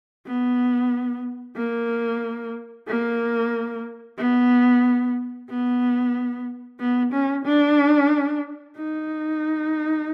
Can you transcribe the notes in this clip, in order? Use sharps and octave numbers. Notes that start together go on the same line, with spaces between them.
B3
A#3
A#3
B3
B3
B3
C#4
D4
D#4